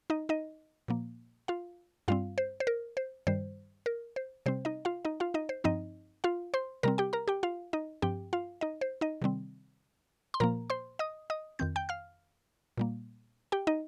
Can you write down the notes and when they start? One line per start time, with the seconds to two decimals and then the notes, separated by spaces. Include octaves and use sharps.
0.10 D#4 D#5
0.29 D#4 D#5
0.88 A#2 F3 A#3
1.48 F4 F5
2.08 G2 G3 C4 F4 F5
2.38 C5
2.60 C5
2.67 A#4
2.97 C5
3.27 G2 D#3 G3 C5
3.86 A#4
4.16 C5
4.46 C3 G3 C4 C5
4.65 D#4 D#5
4.85 F4 F5
5.05 D#4 D#5
5.20 F4 F5
5.34 D#4 D#5
5.49 C5
5.64 G2 F3 C4 D#4 D#5
6.24 F4 F5
6.54 C5 C6
6.83 C3 G3 C4 A#4 A#5
6.98 G4 G5
7.13 A#4 A#5
7.28 G4 G5
7.43 F4 F5
7.73 D#4 D#5
8.02 G2 F3 C4 G4 G5
8.33 F4 F5
8.61 D#4 D#5
8.81 C5
9.01 D#4 D#5
9.22 C3 D#3 G3 C4
10.34 C6
10.40 A#2 F3 A#3 A#4 A#5
10.70 C5 C6
10.99 D#5 D#6
11.30 D#5 D#6
11.59 F2 D#3 C4 G6
11.76 G5 G6
11.89 F5 F6
12.78 A#2 G3 A#3
13.52 G4 G5
13.67 D#4 D#5